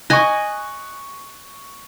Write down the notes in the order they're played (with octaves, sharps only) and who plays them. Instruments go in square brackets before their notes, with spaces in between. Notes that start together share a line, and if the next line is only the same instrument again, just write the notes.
[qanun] D#5 G#5 [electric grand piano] C#6 F#6